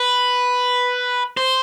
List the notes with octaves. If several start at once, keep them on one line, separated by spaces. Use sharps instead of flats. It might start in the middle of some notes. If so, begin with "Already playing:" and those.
Already playing: B4
C5